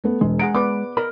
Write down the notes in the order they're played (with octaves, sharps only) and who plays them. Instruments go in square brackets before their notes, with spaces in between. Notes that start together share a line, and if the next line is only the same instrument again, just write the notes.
[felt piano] A3 B3
[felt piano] E1 [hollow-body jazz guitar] G#3
[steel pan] G#4 F#5 A#5 [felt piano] D7
[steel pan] B3 B4 D5 [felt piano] D6
[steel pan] A#4 [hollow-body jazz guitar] D#5 B5